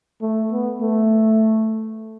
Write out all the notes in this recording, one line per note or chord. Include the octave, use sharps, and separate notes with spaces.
A3
B3
A3